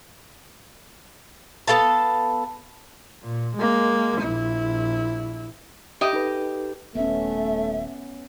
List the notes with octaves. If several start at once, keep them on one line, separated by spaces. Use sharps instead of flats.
B3 A4 F5 A5
A#2
G#3 A#3
A#1 E4
G4 D#5
D#4 A4 B4
D#1 A3 B3 C#4 E5